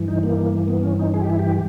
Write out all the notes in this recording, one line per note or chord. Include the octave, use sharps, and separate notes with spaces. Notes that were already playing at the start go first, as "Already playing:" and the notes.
Already playing: G2 E3
D#4
A#3
B3
C#4
D#4
G#4
G4
E4
G4